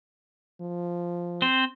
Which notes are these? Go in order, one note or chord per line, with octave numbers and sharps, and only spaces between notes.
F3
C4 C5